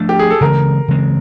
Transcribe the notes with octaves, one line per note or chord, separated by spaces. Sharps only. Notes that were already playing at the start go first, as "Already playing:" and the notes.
Already playing: F3 A3 D4
G4
G#4
A4
C#3 E3 G#3 C4 A#4
C#3 E3 G#3 C4